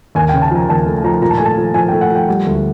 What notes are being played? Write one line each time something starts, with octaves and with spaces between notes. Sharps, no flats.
D#2 G#5
C#3 G5
A5
F3 A#5
D#2 A5
A3
F3 A#5
A#2 A#5
A5
A3 G#5
A5
F3
F3 G#5
A3 G5
F#5
F3 G5
G3 F#5
D2